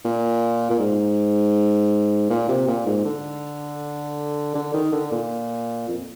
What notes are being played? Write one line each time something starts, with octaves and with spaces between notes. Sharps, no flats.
A#2
A#2
G#2
A#2
C3
A#2
G#2
D3
D3
D#3
D3
A#2
F2